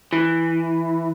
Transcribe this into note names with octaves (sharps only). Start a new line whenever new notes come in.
E3